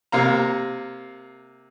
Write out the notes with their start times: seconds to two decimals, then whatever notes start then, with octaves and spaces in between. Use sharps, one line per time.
0.12 C3 A#3 F5 A#5